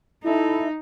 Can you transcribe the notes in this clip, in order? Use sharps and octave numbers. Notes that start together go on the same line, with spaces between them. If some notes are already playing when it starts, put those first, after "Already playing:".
D#4 E4 A4